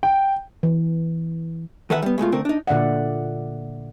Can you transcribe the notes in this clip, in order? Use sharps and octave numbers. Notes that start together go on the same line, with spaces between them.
G5
E3
D#3 E3 A4 B4 E5 F#5
G3 B3
B2 G#3 A3 F4
D3 A3 C4 A#4
D4 D#4
A#2 D3 D5 E5 F#5